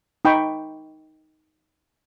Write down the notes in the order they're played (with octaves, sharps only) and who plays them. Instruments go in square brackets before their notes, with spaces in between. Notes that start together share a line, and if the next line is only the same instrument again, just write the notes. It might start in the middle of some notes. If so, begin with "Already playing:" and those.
[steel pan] D#4 G5 B5 C#6